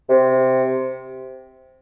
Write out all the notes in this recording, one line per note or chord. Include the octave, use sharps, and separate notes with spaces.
C3